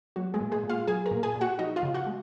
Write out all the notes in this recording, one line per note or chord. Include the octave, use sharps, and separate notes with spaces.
F#3 F#4
G#3 G#4
A#2
G#3 G#4
A#2
F4 F5
F#3 G#4 G#5
A#4 A#5
A#2
G#4 G#5
A#2
F#4 F#5
F3 D#4 D#5
F4 F5
C#3
F#4 F#5
G#3